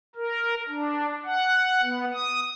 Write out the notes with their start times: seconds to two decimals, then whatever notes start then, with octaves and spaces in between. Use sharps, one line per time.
0.15 A#4
0.68 D4
1.25 F#5
1.82 B3
2.13 D#6